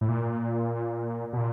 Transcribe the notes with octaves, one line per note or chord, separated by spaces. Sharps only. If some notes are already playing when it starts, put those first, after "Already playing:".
A2
A#2
B2
A#2